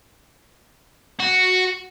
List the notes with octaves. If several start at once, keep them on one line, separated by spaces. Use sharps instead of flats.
F#4